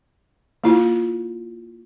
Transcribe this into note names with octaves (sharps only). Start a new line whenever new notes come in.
A#3 E4 F4